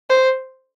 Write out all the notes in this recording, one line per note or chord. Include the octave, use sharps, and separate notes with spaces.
C5